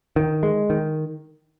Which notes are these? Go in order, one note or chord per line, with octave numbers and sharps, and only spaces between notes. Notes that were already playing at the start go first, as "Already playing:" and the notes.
D#3
G#3
D#3